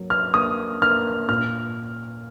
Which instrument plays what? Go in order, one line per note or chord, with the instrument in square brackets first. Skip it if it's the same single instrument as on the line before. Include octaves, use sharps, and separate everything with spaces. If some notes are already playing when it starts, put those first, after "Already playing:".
Already playing: [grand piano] F#3 A#3
F6
A#3 D#6
A#3 F6
A#2 F6